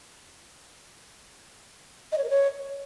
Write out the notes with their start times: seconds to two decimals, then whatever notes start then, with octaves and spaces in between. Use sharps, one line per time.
2.12 D#5
2.18 C#5
2.24 A#4
2.30 C#5